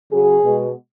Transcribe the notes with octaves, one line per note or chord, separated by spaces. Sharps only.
C#3 F#3 G#4
B2 G#3